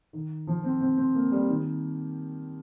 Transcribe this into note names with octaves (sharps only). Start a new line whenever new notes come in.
D#3
F3
C4
C4
C4
A#3
G3
D#3